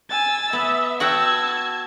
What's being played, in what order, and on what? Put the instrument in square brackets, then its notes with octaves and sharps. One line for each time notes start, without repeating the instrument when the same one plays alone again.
[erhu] G#5 [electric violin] E6 A6
[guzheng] B3 [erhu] E5
[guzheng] F#4 F#5 G5 [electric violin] A5 G#6 [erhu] E6